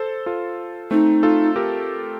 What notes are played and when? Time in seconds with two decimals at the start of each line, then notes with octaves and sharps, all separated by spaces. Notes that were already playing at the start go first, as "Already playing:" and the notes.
Already playing: A4 C5
0.26 F4 A4
0.91 A3 C4 D#4
1.23 F4 A4
1.56 G4 A#4